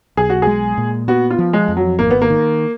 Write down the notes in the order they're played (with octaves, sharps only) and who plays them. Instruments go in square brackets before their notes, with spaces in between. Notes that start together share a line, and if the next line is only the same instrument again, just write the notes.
[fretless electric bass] B1 [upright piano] G#4
[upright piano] F#4
[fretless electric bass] G#3 [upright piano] G#4
[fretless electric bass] A#2
[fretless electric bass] B3 [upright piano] F#4
[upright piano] F4
[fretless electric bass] F3
[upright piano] G#3
[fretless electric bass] F2
[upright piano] F#3
[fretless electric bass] G#1 [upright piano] A#3
[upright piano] B3
A#3
[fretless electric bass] D#3